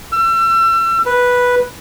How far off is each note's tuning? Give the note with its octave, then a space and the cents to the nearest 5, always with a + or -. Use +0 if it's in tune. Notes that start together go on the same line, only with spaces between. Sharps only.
E6 +35
B4 -5